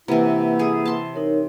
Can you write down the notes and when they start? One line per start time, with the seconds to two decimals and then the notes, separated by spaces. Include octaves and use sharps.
0.08 C3 E3 A#3 E4 B4 F#5
0.59 G#4
0.85 A5 C6
1.14 D#4 A#4 C#5